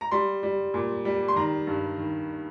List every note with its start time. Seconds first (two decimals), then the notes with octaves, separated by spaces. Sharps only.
0.01 A#5
0.11 G3 C6
0.43 G3
0.74 A#2
1.05 G3
1.28 C6
1.36 D#3 A#5
1.67 G2
1.98 D#3